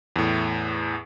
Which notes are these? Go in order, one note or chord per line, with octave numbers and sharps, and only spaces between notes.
E2 A2